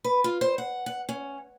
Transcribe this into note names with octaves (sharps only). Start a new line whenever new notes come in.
B4
F4
C5
F#5
F#5
C#4